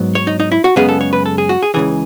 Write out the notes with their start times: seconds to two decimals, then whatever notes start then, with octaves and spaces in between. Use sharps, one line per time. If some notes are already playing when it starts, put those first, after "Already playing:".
Already playing: G#2 F#3 B3
0.15 C#5
0.27 D#4
0.40 D#4
0.52 E4
0.64 F#4
0.76 F#2 C#3 G#3 B3 G#4
0.89 A4
1.01 C#5
1.13 B4
1.26 A4
1.38 G#4
1.49 F#4
1.63 G#4
1.74 C#2 C#3 E3 G#4